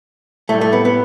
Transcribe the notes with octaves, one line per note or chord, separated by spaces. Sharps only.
A2 G3 A3
A3
B3
B3